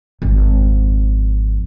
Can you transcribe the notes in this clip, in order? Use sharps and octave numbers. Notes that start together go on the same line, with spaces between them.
G#1 F2